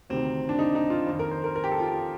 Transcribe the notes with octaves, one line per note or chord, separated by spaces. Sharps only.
D2 C3 D#3 C4
D4
D#4
D#4
F4
F2 D#3
A#4
C5
A#4
A#4
G4
A4
F4
G4